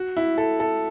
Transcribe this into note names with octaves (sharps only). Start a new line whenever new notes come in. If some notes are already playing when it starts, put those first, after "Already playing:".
Already playing: F#4
E4
A4
A4